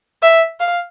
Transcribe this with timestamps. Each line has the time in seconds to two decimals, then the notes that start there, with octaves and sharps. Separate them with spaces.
0.22 E5
0.60 F5